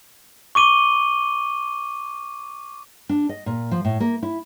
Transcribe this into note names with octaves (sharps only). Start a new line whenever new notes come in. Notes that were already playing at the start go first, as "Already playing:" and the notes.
C#6 D6 D#7 G7
D4
D#5
A#2
F3
A2
A#3
E4